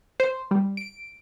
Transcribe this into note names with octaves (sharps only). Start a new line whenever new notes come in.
C5
G3
D7